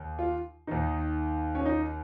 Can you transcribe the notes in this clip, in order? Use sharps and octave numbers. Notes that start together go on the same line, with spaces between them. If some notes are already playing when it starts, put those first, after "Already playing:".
Already playing: D#2
F4
D#2 D#3 D#4
C#4
D#4